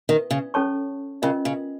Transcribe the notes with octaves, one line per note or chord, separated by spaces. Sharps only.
D#3
C#3
C#4 A4 C#5 A5 C#6
C#3 C#4 F4 A#4 D#5
C#3